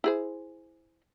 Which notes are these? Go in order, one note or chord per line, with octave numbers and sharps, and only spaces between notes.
E4 G#4 C5